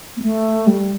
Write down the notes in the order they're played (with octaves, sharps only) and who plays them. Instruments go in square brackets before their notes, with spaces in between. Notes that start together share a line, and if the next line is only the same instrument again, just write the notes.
[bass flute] A#3
A3
G3